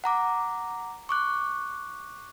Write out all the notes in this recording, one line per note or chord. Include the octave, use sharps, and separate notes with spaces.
F#5 A#5 D6
C#6 D6 F#6